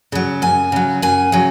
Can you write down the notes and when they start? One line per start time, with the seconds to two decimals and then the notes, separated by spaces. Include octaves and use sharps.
0.12 C#3 F#3
0.42 F#2 G#5
0.72 C#3 F#3
1.02 F#2 G#5
1.32 C#3 F#3